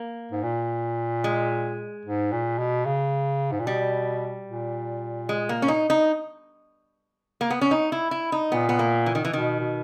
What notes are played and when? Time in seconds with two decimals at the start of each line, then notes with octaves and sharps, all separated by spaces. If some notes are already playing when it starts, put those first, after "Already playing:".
Already playing: A#3
0.32 G#2
0.43 A#2
1.24 G#3
2.05 G#2
2.32 A#2
2.58 B2
2.86 C#3
3.52 G#2
3.59 A#2
3.67 B2 G3
4.47 A#2
5.29 G#3
5.49 A#3
5.62 C#4
5.68 D#4
5.90 D#4
7.41 A#3
7.50 B3
7.61 C#4
7.71 D#4
7.92 E4
8.11 E4
8.32 D#4
8.52 A#2 B3
8.69 B3
8.79 A#3
9.06 E3
9.15 D#3
9.25 E3
9.33 B2 D#3
9.60 B2